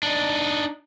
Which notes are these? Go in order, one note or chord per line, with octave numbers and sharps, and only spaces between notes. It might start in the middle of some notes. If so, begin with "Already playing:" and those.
D4 D#4